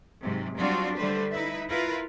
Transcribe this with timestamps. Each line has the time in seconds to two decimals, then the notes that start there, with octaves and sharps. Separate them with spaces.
0.22 G#2 C3 F#3
0.58 F#3 G3 C4 D4 F4 F#4
0.97 D3 G3 A3 B4 C5
1.31 D#4 E4 B4 E5
1.68 E4 F4 A#4 B4 F5